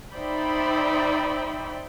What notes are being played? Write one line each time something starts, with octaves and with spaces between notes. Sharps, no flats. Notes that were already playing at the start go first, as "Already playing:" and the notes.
D#4 C5 D5 E5 G5 B5